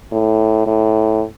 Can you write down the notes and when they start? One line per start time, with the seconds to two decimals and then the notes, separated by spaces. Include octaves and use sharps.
0.12 A2
0.67 A2